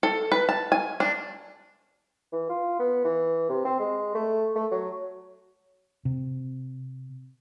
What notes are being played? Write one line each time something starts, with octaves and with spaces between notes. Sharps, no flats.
A4
B4
A5
G#5
D4
E3
F4
B3
E3
C3
C4
G#3
A3
A3
F#3
C3